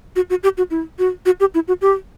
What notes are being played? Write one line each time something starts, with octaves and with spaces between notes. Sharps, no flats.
F#4
F#4
G4
F#4
E4
F#4
F#4
G4
E4
F#4
G4